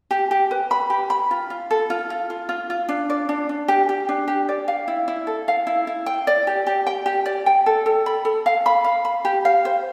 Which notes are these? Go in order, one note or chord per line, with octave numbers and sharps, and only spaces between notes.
G4
G4
B4
B5
G4
B5
F4
F4
A4
F4
F4
F4
F4
F4
D4
D5
D4
D4
G4
G4
D4
G4
D5
F5
E4
E4
A4
F5
E4
E4
G5
D5
G4
G4
G5
G4
D5
G5
A4
A4
B5
A4
F5
B5
F5
B5
G4
F5
C5